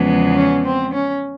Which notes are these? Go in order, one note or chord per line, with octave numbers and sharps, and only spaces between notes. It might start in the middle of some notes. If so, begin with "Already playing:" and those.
Already playing: E2 C#3 F3 G#3 B3
C#4
C4
C#4